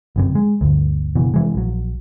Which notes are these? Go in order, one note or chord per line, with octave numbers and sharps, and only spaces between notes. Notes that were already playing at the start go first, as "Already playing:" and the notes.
G1 F#2 C3
G#3
G1 D2
F#1 B2 E3
C3 E3 G#3
A#1 F#3